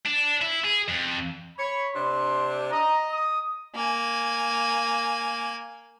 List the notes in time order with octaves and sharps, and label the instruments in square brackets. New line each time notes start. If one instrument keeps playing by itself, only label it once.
[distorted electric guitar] D4
E4
G#4
F2
[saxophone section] C#5 [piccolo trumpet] B5
[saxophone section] C3 D4 [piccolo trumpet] C6
[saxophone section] D#5 [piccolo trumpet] A#5
[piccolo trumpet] D#6
[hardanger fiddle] A#3 G#5